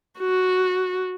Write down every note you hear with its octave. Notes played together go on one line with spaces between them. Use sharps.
F#4